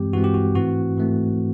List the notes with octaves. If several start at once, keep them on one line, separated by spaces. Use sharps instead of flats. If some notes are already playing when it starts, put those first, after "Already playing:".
Already playing: G2 E3 G#3 C4 G4
G2 E3 G#3 C4 F#4
G4
F#4
G#2 E3 A3 C4 F#4
G#2 E3 A3 C4